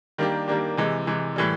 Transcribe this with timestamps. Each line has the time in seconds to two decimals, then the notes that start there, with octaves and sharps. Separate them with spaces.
0.18 D#3 G3 A#3 D4 G4
0.48 D#3 G3 A#3 D4 G4
0.77 C3 E3 G#3
1.07 C3 E3 G#3
1.36 A2 E3 G3